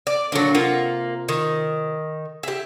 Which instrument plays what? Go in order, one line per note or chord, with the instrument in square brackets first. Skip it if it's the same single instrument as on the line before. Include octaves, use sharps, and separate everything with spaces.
[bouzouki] D5
[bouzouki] A#2 F#3 [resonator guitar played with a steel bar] D3 D4 A4
[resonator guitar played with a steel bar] C3 F4 F#5 [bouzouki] A#3
[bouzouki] D#3
[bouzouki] G4 E5 [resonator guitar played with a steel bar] G#4